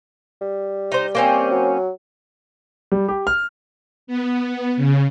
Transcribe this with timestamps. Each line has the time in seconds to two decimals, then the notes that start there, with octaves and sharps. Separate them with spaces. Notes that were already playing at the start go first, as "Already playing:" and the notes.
0.41 G3
0.92 D#4 C5
1.15 A#3 C4 C#4
1.51 F#3
2.92 G3
3.08 G4
3.27 F6
4.07 B3
4.77 C#3